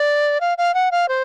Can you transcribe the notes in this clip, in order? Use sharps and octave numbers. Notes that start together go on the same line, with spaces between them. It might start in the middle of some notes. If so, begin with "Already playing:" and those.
Already playing: D5
F5
F5
F#5
F5
C5